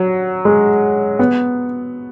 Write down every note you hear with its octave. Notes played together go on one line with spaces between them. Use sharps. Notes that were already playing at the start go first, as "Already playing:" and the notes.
Already playing: F#3
G#3
B3